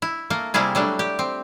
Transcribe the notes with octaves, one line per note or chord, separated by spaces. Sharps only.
E4
A3 A#3
C3 G3 A#3 E4 G#4
F#3 G3 A3 D4
G4
C4